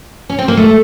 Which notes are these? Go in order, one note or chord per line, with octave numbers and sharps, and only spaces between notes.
C#4
C4
A#3
A3